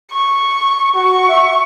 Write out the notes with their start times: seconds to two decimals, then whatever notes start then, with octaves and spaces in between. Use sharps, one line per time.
0.11 C#6
0.95 F#4 C#6
1.29 E5